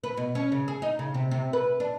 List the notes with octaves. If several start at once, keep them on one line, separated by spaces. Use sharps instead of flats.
B4
B2
C#4
C#3
G#4
D#4
C#3
C3
C3
B4
D4